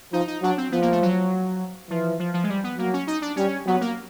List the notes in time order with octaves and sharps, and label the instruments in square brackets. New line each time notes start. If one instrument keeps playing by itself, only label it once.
[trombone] F3 [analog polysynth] D#4
[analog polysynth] D#4
[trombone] F#3 [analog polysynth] D4
[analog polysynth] C4
[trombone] F3 [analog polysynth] B3
[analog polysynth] A#3
A3
F#3
[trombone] E3 [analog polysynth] F3
[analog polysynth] F3
F3
G#3
G3
B3
[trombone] F#3 [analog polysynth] A#3
[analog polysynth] C#4
D#4
D4
[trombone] G3 [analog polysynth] C#4
[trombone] F#3 [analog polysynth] B3
[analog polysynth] A#3